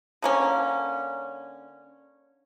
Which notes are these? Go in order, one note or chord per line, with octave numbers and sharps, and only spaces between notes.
D3 A#3 C#4